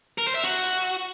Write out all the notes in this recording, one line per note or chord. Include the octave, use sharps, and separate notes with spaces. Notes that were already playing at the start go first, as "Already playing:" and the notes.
A#4
C5
E5
F#4